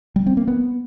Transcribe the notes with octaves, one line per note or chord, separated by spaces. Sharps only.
G3
C4
A#3
B3